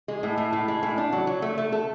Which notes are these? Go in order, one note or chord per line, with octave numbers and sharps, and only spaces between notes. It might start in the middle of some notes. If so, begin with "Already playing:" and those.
G#3
A2
A2
A2
G#3
A2
D4
F#3
F#3
A3
A3
A4